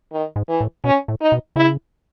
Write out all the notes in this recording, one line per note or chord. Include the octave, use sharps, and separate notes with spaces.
D#3
G#2
E3
A2
B2 C#4
A2
D#4
B2
C#3 E4